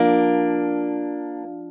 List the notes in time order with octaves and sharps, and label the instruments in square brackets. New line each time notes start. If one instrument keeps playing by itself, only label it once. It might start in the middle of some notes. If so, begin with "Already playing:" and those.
Already playing: [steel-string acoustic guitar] F3 A#3 D4